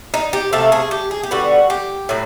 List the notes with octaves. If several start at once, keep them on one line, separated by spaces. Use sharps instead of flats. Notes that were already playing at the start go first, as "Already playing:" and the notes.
D#4
G4
C3 F3 A3 A4
G#4
G4
G#4
G4
D3 G3 B3 F#4
G4
A2 F#3